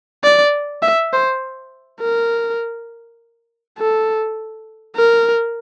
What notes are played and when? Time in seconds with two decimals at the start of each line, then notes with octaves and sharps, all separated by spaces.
0.24 D5
0.82 E5
1.12 C5
2.01 A#4
3.78 A4
4.96 A#4